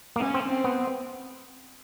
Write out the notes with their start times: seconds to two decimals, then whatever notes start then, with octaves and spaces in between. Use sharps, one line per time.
0.16 A#3
0.20 B3 C#4
0.34 C4
0.49 C4
0.64 B3